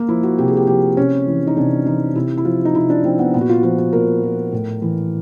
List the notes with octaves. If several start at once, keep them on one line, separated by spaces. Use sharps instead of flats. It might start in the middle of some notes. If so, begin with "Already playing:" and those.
Already playing: A#3
F3 E4
F#4
C3 G4
G#4
G4
F3 G4
C3 C#4
E3
D#4
C3 D4
E3 D#4
C3 E4
E4
F3 F4
D#4
C3 E4
D4
F3 C4
B3
A#2 B3
F#4
F4
F3 F4
F#4
A#2 A#4
F3
A2
E3